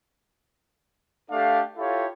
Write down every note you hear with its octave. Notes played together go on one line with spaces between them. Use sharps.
A3 D4 G4 A4 F5
E4 F4 G4 A4 C#5 F5